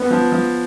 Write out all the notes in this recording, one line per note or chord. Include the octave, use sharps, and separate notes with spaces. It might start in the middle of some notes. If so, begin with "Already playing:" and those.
Already playing: B3
F3
F3